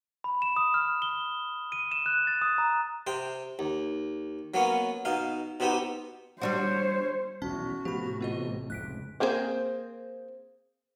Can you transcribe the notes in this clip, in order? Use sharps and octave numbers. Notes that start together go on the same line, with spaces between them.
B5
E7
D#6
F6
G7
D#7
E7
F#6
A6
D#6
A#5
C3 C5 G5
D#2
F#3 A#3 B3 C#4
B2 D#4 F5
B2 B3 C4 D#4 G4
G3 D4 F#4 C5 C#5
D#1 B1 E2 C#4 F#4 A5
A2 C3 F3 A3 B3 G4 B5
A1 B3 C4 F4 D#5
F1 C#2 F#6 B6 D7
A#3 C4 G#4 A#4 C5